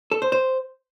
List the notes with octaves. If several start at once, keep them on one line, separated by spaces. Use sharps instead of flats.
A4
C5
C5